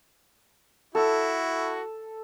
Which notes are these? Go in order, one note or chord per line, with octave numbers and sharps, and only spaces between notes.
E4 F#4 A4